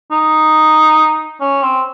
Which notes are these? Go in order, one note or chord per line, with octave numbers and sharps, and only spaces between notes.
D#4
C#4
C4